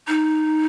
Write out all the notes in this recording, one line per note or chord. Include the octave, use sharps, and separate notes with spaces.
D#4